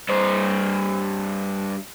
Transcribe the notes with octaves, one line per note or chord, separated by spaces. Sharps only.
G2 C5